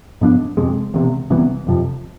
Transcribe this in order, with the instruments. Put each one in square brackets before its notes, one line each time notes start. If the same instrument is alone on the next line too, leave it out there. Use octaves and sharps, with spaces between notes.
[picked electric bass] G#2 F3 B3 D4
F2 C3 G#3
E1 E2 C3
C2 C3 E3 B3
F1 F2 C3 F3